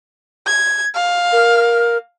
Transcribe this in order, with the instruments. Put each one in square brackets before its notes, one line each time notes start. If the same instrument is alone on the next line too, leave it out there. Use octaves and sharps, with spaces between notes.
[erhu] G#6
F5
[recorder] A#4